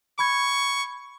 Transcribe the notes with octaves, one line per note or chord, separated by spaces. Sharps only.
B5 C#6 G#6